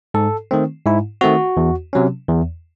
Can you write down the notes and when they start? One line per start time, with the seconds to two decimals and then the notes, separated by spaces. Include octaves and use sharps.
0.14 G#2 A4
0.51 D#3 A3 C4
0.86 G#2 E4
1.21 D#3 A3 C4 F#4
1.57 E2
1.93 C3 F#3 C#4
2.28 E2